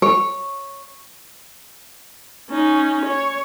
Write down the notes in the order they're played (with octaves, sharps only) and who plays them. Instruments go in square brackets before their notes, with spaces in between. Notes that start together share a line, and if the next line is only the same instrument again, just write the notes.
[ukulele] C#5
[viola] C#4 D#4
C#5